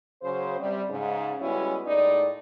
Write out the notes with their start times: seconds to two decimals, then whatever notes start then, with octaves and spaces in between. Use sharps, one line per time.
0.22 C#3 F#3 C5
0.60 C3 G3
0.89 G#2 C#3
1.41 G3 G#3 B3 C#4 E4 F#4
1.86 D#2 A2 G#3 D#4 D5